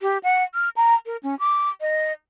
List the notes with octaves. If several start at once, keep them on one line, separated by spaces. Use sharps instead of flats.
G4
F#5
F6
A#5
A#4
C#4
D6
D#5